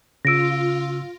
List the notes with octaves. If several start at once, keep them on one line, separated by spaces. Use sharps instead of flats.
C#3 F4 E6 A#6 D7